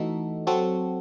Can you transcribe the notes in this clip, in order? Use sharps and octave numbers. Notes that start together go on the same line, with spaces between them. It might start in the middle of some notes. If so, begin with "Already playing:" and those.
Already playing: E3 A3 D#4 F#4 A4
F#3 C4 F#4 A4